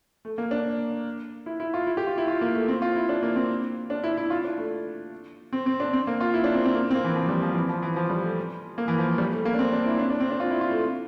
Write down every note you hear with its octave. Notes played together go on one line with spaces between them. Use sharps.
A3
A#3
D4
E4
E4
F4
E4
G4
F4
E4
F4
A#3
A3
C4
F4
E4
D4
A#3
C4
D4
E4
E4
F4
D4
A3
C4
C4
D4
C4
A#3
F4
E4
D4
C4
C4
A#3
C4
A#3
E3
F3
G3
F3
E3
F3
E3
F3
G3
A3
A#3
E3
F3
G3
A3
A#3
D4
C4
D4
E4
D4
D4
C4
D4
F4
E4
F4
A3